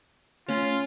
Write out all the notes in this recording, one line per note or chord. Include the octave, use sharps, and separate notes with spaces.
A3 C#4 F4